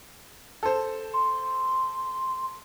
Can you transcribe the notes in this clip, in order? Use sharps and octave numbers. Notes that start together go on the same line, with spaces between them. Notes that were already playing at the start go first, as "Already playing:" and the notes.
A4 C5
C6